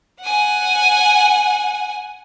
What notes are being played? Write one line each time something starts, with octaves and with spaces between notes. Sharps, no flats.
F#5 G#5